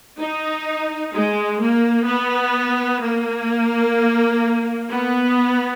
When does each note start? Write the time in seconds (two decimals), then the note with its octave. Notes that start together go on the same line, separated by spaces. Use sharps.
0.19 D#4
1.13 G#3
1.61 A#3
2.07 B3
3.02 A#3
4.91 B3